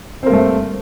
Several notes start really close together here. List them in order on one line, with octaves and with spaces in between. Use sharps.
C4 A#3 G2 A3